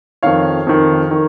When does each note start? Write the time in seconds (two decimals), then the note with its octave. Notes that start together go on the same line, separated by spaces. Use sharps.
0.23 F2 D#3 C#5 F5
0.67 F2 D#3
1.11 D#3